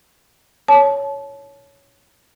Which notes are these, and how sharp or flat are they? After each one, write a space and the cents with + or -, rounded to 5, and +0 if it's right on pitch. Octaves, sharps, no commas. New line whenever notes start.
C#5 +10 A5 -25